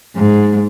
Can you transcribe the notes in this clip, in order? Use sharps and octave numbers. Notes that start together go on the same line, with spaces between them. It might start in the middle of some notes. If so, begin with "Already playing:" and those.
G#2